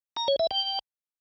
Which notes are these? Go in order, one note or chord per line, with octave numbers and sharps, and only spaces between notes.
A#5
C#5
E5
G5